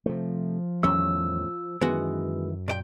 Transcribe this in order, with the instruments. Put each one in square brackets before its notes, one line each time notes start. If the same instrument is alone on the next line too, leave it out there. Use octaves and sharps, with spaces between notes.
[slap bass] C3 A3 [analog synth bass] F3
[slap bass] E2 D#3 G3 [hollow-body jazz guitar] A2 C#4 [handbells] E6
[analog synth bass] F#2 [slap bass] D#3 E3 [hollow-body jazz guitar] G#3 B3 F#4
[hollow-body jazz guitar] A#2 D5 G5